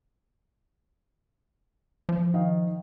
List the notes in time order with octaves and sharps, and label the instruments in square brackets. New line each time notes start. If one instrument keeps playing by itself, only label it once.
[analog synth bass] F3
[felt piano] D#3 D#5 F5